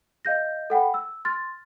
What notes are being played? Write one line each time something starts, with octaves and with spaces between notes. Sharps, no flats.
D#5 F5 G6 A#6
A4 F#5 G5 B5
E6
C6 F6 A6